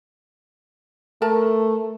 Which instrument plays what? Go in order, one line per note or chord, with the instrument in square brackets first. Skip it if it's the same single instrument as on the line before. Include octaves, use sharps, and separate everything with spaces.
[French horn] A3 [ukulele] A#4 A5